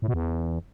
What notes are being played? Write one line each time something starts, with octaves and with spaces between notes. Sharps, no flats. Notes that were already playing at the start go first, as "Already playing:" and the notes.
A2
B2
E2